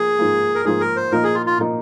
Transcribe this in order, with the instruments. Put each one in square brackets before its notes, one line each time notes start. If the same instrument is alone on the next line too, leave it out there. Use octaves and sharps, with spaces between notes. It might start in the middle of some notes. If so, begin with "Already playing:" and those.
Already playing: [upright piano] F3 A#3 [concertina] G#4
[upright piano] G#2 F3 A#3
[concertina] A#4
[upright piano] G#2 F3 A#3 [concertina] G#4
[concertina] A#4
C5
[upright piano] A#2 F3 A#3 D#4 [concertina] A#4
[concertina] G#4
F4
F4
[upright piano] A#2 F3 A#3 D#4